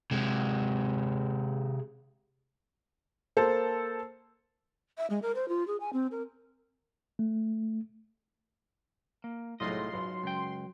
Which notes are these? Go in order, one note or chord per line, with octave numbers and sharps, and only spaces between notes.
C3 G#3
A#3 A4 C5
E5
G#3
A#4
C5
F4
G#4
G#5
C4
A#4
A3
A#3
C2 A2 F#3 G#3 D#4 F4 D#5 C6
G#1 F#3 B4
C#2 F#2 G5